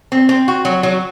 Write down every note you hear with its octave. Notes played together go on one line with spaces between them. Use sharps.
C4
C4
F#4
F#3
F#3